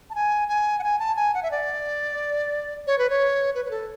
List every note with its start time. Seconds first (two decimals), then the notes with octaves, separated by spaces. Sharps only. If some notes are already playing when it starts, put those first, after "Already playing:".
0.10 A5
0.15 G#5
0.48 G#5
0.79 F#5
0.83 G#5
0.99 A5
1.16 G#5
1.34 F#5
1.43 E5
1.51 D5
2.87 C#5
2.98 B4
3.10 C#5
3.55 B4
3.65 B4
3.71 A4